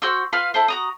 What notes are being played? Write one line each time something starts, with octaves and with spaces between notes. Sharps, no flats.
F#4 C5 F#5 E6
F4 B4 F5 F6
E4 A4 C5
F#4 A#5 D#6